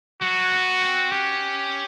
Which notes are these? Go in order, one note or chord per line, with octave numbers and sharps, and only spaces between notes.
F#3 F#4
B3
C4
C#4 G4